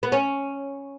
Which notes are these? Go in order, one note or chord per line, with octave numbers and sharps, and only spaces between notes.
B3
C#4